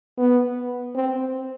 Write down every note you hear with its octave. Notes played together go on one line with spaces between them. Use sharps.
B3
C4